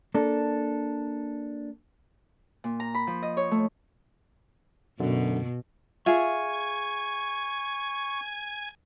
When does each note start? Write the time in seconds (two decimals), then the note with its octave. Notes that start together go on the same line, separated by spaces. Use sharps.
0.14 A#3 D4 A4
2.64 A#2
2.80 A#5
2.95 B5
3.07 F3
3.23 D#5
3.37 C#5
3.51 A3
5.00 F#2 B2 D3
6.06 F4 G#4 E5 G#5 C#6 G#6